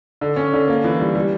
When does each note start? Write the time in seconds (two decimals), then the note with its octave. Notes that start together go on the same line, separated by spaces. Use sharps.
0.21 D3
0.36 C#4
0.53 D3
0.68 A#3
0.84 E3
1.00 G3
1.15 G3